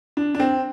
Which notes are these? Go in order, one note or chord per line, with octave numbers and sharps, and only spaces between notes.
D4
D4
C4